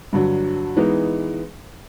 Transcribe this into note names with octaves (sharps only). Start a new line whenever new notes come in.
G2 D3 F#3
E3 G#3 B3 D#4